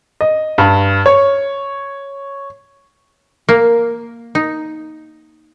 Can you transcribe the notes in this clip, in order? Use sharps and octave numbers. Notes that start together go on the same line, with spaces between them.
D#5
G2
C#5
A#3
D#4